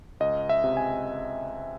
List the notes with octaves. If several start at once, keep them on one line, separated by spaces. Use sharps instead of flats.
C#2 D#5
E5
C3
G#5